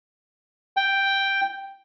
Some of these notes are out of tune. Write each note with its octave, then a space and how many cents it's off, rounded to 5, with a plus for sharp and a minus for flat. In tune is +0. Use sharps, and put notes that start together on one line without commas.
G5 +0